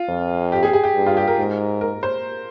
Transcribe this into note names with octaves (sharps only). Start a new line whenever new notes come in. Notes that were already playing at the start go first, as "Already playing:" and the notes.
Already playing: F4
F2
G4
G#4
G#4
G4
G2
F4
G4
A#4
G#2
A#4
C5